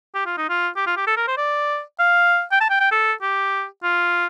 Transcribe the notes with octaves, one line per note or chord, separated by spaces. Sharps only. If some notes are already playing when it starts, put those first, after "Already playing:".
G4
F4
D#4
F4
G4
F4
G4
A4
A#4
C5
D5
F5
G5
A5
G5
G5
A4
G4
F4